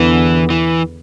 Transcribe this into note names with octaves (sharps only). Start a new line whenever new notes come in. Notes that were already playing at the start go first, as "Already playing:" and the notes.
Already playing: E2 D3 E3 B3
E3